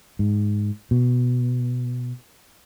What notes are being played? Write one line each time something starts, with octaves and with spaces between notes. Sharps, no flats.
G#2
B2